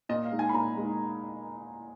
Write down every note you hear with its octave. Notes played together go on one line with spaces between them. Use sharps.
A#2 D#5
F5
G#3 D#4
G#5
B5
A#2 A#5
G#3 D#4